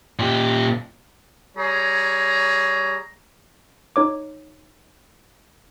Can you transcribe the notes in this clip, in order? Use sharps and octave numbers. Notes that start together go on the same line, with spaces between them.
A#2 G4
G3 G#4 C#5 A#5
D#4 C#5 D6